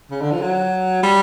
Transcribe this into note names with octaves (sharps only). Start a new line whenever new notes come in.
C#3
D3
F3
F#3
G3